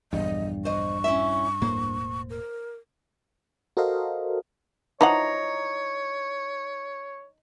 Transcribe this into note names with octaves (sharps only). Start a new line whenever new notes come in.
A#1 E2 G2 D#5
C5 D#5 C#6
C#4 E4 E5
E1 A2 A#3 C5
A#4
F#4 A4 A#4 C5 D#5 F5
E3 F3 D#4 C#5 F#5 A#5